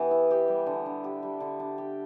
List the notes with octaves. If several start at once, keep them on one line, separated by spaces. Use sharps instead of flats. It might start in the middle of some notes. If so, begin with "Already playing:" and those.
Already playing: E3 B3 G4
E4
G4
G3
D3
D4
G4
G3
D3
D4
G4